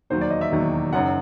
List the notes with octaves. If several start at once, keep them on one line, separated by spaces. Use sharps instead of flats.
E1 D#2 D#3 F#3 C5
D5
D#5
E5
E1 D#2 D#3 F#3
F#1 F#2 D#3 F#5